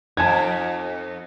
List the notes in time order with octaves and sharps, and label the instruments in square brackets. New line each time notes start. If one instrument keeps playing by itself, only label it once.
[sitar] F2 D#4 [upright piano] A5 G#6